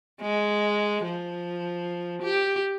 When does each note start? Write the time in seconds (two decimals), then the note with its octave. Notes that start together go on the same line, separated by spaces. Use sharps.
0.21 G#3
1.05 F3
2.22 G4